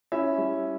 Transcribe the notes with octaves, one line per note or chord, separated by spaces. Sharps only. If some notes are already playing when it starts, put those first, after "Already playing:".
C#4 E4 E5
G3